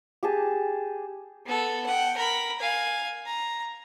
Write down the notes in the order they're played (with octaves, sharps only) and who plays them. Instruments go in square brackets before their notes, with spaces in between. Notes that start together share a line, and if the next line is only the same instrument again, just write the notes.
[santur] G4 G#4 A5
[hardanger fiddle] B3 A4
F#5 G5
A#4 B5
F5 G#5
A#5